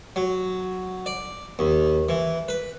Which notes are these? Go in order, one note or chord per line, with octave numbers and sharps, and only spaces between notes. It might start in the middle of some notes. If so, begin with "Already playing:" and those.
F#3
D5
D#2
E3
B4